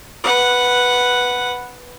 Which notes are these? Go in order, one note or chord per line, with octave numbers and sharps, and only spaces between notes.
B4 F#5